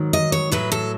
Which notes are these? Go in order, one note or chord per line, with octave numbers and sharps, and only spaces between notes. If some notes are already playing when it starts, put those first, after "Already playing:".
Already playing: G#2 D#3 F#3
D#5
C#5
A2 F#3 B4
A4